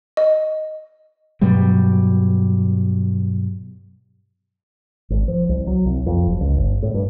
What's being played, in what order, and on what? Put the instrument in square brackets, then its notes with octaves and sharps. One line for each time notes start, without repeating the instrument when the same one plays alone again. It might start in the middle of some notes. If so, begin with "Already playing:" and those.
[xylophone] D#5
[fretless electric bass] G2 B2 F#3 G3
[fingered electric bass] G#1
F3
C2
F#3
C2
F2
F#1
C#2
G1
A2
G2